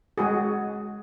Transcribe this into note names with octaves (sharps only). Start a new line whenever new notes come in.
G#3 F#4 G#4